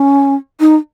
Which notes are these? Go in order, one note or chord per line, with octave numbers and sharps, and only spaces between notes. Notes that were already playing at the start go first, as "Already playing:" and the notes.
Already playing: C#4
D#4